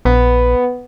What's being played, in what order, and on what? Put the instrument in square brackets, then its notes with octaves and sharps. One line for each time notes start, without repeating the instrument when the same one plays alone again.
[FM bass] A#1 [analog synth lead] B3